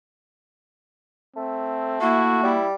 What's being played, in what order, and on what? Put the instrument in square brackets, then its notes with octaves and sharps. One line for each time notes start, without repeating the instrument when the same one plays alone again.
[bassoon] A3 [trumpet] C4
[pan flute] A#3 [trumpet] E4 [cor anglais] F#4
[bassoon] G3 [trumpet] E4